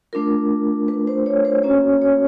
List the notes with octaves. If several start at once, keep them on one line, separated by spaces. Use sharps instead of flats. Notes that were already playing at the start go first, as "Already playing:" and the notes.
A3 D4 F4 A#4
B4
C5
C#5
C5
A#3 C#4 F#4 C#5
C#5